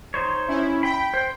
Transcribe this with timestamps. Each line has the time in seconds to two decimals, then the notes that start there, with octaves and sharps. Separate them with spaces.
0.14 D#4 C5 C#5
0.48 C#4 E4
0.83 G5 B5
1.14 C5